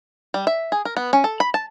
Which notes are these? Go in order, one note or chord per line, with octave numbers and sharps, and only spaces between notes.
G3
E5
G#4
A#4
B3
C#4
A4
B5
A5